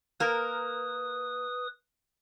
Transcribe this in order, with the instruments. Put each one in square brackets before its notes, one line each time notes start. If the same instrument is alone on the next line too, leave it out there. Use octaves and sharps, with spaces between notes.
[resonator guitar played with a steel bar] A#3 A#4 [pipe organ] B4 D#6